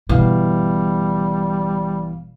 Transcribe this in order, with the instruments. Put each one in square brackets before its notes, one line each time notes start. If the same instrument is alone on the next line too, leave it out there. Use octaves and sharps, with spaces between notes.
[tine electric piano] G1 E3 F5 [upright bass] B2 [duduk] G3